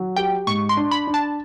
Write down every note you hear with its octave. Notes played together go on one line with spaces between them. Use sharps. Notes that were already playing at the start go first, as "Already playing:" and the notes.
Already playing: F#3
G4 G5
G#2 C#6
C6
D4
B5
D4
A5